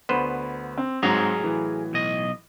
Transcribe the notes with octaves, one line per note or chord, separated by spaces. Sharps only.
D2 B3 B4 C5 B5
C4
G#2 F#3 C4 G#4 F5 A#5 G#6
A2 E3
B1 D#5